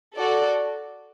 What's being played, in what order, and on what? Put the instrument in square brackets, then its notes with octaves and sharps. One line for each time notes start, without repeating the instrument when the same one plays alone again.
[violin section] F#4 A4 D5